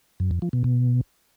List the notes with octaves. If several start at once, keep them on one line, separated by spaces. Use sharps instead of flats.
F#2
F2
F3
B2
B2